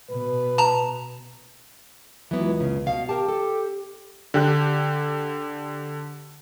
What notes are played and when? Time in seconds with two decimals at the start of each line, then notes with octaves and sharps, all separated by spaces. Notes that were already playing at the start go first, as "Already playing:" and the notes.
0.11 B2 B4
0.58 A5 A#5
2.31 C#2 E3 F#3 B3
2.60 F#2 C#3
2.86 B2 F5
3.09 G4 A#4 A5
3.28 A4
4.34 D3 G4 F#6